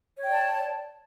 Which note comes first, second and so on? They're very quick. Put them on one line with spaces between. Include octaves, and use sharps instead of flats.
C#5 G5 D5 A5